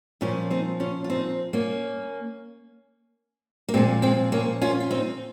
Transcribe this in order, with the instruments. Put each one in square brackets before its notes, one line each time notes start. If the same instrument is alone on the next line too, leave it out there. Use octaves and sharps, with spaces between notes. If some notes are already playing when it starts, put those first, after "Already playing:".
[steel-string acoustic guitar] A#2 F3 C#4 F4
C4 D#4
C#4 F4
F4
C4 D#4
A#3 C#4
A#3
A#2 F3 G#3 C4
G#3 C4
A#3 C#4
C#4 F4
F4
C4 D#4